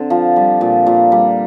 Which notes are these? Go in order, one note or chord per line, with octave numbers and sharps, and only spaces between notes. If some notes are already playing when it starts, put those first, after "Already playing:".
Already playing: D3 C4
F3
G3
A#2
A#2
G3